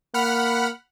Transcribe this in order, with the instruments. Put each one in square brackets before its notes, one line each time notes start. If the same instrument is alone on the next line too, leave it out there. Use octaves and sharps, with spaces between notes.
[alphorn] A#3 [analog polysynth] F#5 B5 F6